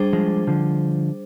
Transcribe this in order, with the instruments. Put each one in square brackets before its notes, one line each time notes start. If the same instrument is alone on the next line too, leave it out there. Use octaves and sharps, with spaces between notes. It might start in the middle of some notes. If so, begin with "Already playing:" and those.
Already playing: [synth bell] G3 D4 G#4 C5
[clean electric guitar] F3 G#3
D3 F3